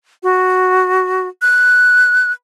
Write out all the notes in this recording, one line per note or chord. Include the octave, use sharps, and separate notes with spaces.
F#4
F#6